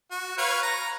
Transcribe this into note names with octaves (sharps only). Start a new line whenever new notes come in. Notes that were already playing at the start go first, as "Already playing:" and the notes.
F#4
B4 C#5 F5
A#5